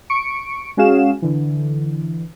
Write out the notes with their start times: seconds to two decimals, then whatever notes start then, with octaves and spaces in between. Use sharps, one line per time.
0.10 C#6 C#7 D7
0.77 G#3 C#4 F#4 G#4 F5 E7
1.22 D3 E3